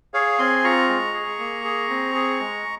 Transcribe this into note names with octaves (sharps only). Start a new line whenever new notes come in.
G#4 C#5 F5
C4 G#5 C6
F4 A#5 C#6
G#3
G#4
A#3
G#4
C4
G#4
G#3